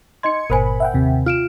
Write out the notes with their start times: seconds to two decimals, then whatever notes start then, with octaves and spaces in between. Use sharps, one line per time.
0.23 D#4 D#5 C6 G#6 C#7
0.50 G1 A#2 A#4 C5 G#5 B5
0.80 E5 F#5 G5
0.94 D#2 C3
1.26 F4 F6 D7 E7